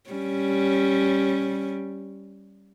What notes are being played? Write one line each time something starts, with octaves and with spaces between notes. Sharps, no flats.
G3 C#4